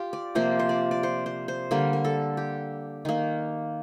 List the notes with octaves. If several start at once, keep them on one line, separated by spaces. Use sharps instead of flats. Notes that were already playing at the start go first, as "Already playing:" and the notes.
Already playing: F4 G4
D5
C3 F3 A#3 C5
C5
D5
D5
C5
C5
C5
D3 G3 A#3 A#4
A#4
A4
G4
D#3 A#3